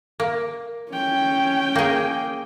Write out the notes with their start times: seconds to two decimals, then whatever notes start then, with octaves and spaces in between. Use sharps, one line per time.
0.20 A#3
0.91 C#4 G5
1.75 A#3 G#4